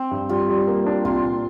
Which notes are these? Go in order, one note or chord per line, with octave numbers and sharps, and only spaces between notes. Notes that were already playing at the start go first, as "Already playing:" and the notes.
Already playing: C4
G2
G3 F4
G3
A#3
D4
C2 F4
A#2